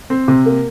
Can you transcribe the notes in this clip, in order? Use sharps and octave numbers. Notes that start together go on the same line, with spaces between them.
C4
C3
A#3